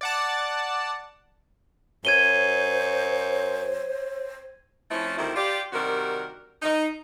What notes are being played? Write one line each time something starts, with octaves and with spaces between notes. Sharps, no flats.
D5 F#5 A5
F#2 C5 C#5 G#6 D#7 G7
F3 A3 C4 C#4 E4
D2 D#3 G3 C4 E4
F4 G4 D5
C3 D#3 G3 D4 F#4 A#4
D#4